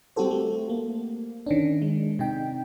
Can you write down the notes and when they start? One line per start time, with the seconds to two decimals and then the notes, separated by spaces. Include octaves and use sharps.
0.16 G3 C4 F#4 G4 A4 C5
0.31 A3
0.69 A#3
1.46 D#3 C#4 D4
1.82 G#3
2.19 C3 D#4 G5